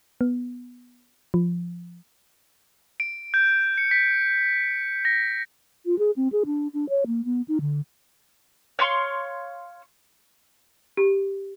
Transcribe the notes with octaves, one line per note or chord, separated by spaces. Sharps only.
B3
F3
D7
G6
C#7
B6
A#6
F4
G#4
C4
G#4
D4
D4
C#5
A#3
B3
D#4
D3
C#5 F5 C6 C#6
G4